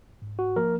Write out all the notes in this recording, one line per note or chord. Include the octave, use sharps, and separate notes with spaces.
G#2
F#4
F3 A#3 A#4